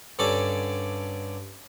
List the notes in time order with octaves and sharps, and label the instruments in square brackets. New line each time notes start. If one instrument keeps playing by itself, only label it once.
[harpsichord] G2 D3 C#4 A4 D5 D6